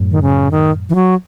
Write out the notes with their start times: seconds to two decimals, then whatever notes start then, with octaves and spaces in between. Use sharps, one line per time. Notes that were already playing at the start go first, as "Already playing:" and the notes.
Already playing: F#2 A2
0.11 D#3
0.22 C#3
0.51 D#3
0.89 E3
0.95 F#3